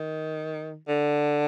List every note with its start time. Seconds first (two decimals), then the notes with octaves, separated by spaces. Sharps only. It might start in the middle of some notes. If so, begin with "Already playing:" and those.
Already playing: D#3
0.88 D3